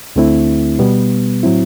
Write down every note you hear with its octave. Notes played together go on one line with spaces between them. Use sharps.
D2 D3 A3 C4 E4
B2 G3 B3
A2 F#3 C4 E4